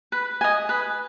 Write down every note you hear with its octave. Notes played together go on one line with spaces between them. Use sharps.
B4
D#5 G#5
B4